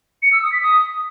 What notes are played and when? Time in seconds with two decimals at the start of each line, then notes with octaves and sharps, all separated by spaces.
0.22 C#7
0.32 E6
0.42 D#6
0.52 B6
0.62 D#6